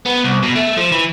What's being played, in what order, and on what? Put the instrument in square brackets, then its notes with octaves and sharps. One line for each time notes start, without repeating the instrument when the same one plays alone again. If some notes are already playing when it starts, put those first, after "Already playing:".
[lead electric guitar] B3
C2
B2
A3
F3
E3